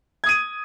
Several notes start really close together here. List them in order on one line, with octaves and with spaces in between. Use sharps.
G#6 D#6 D#7